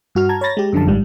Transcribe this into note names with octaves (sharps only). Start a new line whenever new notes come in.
G2 F#4 F6
A5 A#5 G#6
C#5 A#5 B5 A6 A#6
G#3 G4
F#2 D3 F3 A5
G#1 G#2 G3